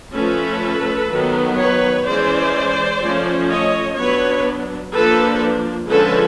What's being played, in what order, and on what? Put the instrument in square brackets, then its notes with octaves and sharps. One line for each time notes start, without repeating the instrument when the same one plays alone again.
[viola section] F3 A3 C#4 A4 B4
D#3 F#3 B3
B4 C#5
E3 G#3 C#4 C5 D5
F3 A3 C#4
C#5 D#5
F#3 B3 D4 B4 C#5
F3 A#3 D4 A4 B4
D3 F3 G#3 C#4 A4 B4